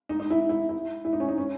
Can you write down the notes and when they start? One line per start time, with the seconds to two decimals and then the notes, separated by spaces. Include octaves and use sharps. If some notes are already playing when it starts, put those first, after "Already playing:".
0.09 D#4
0.20 D#4
0.30 E4
0.49 E4
0.69 E4
1.05 E4
1.13 D#4
1.20 C#4
1.29 D#4
1.38 C#4